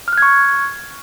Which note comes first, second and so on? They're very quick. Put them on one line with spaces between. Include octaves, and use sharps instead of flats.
F6 F#6 G#6 C#6